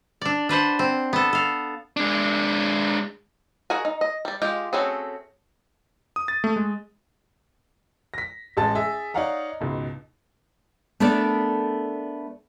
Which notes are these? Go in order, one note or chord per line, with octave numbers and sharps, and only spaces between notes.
D4 D5
D4 B4 C5 F#5
C4
B3 A4
A4 F5
G#3 D4
F#4 G#4 A#4 F#5 G#5
D#4
D#5
G3 D5
G#3 F4 G4 G5
A3 C4 C#4 F#4 G#4
D#6
A6
A3
G#3
A#6 B6
A1 G#3 A5 A6
G#4 D#5 E5
D#4 C#5 D5 F5 F#5 A#5
C#2 G#2 B2
A3 B3 D4 A4 A#4 D5